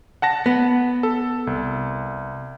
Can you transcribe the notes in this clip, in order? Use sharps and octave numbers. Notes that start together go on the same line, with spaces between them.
F#5 A5 A#6
B3
A4
C2